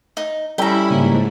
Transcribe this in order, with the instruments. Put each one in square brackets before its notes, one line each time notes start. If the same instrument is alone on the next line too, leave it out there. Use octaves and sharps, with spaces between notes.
[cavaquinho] D#4
[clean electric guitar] G3 C#4 A4 [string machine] E4 B5 [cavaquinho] G5 A#5
[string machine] G#2 [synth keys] C#3 A#3